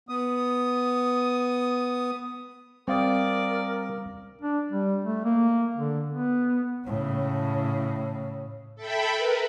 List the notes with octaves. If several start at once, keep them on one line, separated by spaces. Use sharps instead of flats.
B3 D#6
G3 C4 A#4 D5 F5 D#6
D4
G3
A3
A#3
D3
B3
A2 C#3
A4 E5 G5 B5
A#4 B4